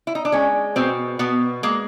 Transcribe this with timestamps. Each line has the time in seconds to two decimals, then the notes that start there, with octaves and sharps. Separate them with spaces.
0.07 E4
0.15 D#4
0.25 D4
0.32 G#3 C#4
0.76 B2 C4
1.19 B2 B3
1.63 G#3 A#3